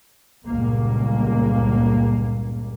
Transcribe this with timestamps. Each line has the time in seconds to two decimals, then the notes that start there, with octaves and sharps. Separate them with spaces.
0.45 G1 C#2 A#2 A#3